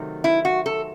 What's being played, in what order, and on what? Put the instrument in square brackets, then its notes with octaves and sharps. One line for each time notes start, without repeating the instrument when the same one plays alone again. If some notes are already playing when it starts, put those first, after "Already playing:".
Already playing: [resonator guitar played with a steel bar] C3 D#3 F#3 A3
E4
F#4
A4